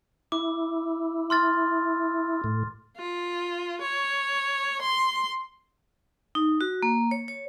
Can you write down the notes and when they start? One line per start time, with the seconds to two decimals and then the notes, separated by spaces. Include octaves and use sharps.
0.32 E4 D6
1.30 C6 F6 A6
2.44 A2
2.97 F4
3.81 C#5
4.82 C6
6.35 D#4
6.61 F#4
6.83 A#3
7.11 C#5
7.28 C#5